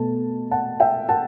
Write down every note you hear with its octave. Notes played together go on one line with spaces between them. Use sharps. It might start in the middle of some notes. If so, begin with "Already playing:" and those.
Already playing: B2 A3 A5
F#5 A5
E5 G5
F#5 A5